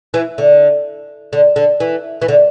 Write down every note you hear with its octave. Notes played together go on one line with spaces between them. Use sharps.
E3
D3
D3
D3
E3
E3
D3